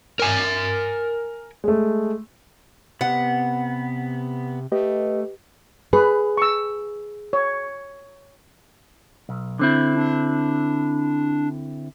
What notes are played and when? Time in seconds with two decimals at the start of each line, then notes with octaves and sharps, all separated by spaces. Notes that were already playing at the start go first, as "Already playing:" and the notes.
0.20 A#4 G#5
1.64 G#3 A3
3.01 C3 B3 F#5
4.72 A3 G4 B4 D#5
5.93 G#4 B4
6.37 C#6 E6
7.33 C#5
9.29 B1
9.59 D3 C4 E4
9.96 D4